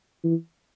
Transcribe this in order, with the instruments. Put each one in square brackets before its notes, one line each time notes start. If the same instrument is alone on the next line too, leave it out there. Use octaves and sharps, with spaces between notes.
[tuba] E3